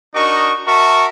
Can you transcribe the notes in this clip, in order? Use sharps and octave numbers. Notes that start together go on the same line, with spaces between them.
D4 D#4 F#4 A#4 D#5 C#6
F#4 A#4 E5 A5 C#6